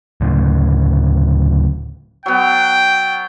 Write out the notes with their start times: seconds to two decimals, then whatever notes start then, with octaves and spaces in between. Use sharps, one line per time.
0.21 D2 A2 C#3
2.26 F#3 B3 G5